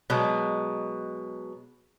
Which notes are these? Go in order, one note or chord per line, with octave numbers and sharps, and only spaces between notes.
B2 F#3 G#3